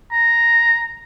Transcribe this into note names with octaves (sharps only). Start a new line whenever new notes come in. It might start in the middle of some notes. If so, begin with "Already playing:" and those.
A#5